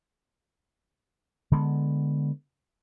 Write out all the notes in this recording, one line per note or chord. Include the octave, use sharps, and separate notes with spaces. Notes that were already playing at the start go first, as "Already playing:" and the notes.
D3 G#3 B3